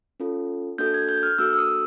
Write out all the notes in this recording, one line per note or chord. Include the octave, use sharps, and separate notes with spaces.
C#4 F4 A4
A#3 D4 F#4 A4 G6
G#6
G6
F6
A#3 D4 F#4 A4 E6
E6
D#6